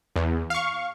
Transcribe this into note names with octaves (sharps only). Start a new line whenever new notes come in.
E2
F5 C#6